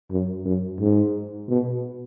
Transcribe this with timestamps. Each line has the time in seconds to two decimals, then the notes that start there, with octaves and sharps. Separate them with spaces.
0.11 F#2
0.45 F#2
0.80 G#2
1.49 B2